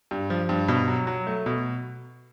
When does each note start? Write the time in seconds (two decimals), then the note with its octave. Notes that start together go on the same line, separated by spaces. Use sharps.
0.11 G2
0.30 F3
0.49 G2
0.68 B2
0.88 F#3
1.07 F#3
1.27 A3
1.46 B2